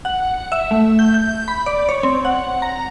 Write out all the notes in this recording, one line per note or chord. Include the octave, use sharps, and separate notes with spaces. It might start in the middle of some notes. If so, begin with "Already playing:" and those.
F#5
E5
A3
G6
G6
B5
D5
C#5
C4
F#5
A#5